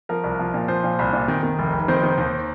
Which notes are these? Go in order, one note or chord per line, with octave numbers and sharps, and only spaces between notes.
F3 A#4
C2
F3
A#2
F3 C5
A#2
C2
A#2
D#3
D#3
F1
F1
D#3 C5
D#3
D#2